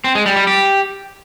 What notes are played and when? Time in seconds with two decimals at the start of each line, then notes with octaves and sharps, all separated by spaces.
0.04 C4
0.15 G#3
0.26 G3
0.37 G3
0.47 G4